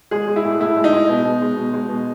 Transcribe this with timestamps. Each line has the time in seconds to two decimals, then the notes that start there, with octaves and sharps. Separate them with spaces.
0.11 G#3 G#4
0.28 G#3
0.36 E4
0.45 A2
0.60 A2 E4
0.77 G#3
0.84 D#4
0.93 G#3
1.09 B2
1.25 B2
1.41 G#3
1.57 B2
1.74 G#3
1.89 B2